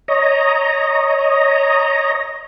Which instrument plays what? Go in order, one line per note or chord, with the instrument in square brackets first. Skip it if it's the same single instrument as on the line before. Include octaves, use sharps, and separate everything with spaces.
[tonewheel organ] C#5 D#5 A#5